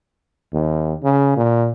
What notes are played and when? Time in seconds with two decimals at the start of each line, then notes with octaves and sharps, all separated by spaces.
0.53 D#2
1.03 C#3
1.37 A#2